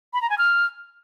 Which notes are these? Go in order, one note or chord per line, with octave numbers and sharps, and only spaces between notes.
B5
A#5
G#5
F6